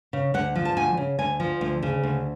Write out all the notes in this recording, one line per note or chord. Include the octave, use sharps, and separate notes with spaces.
C#3
D2 F#5
F3
A5
D2 G#5
C#3
D2 G#5
F3
D2
C#3
D2